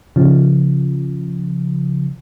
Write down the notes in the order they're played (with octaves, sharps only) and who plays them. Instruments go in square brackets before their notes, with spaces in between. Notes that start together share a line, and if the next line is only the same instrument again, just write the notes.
[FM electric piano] C#3 F3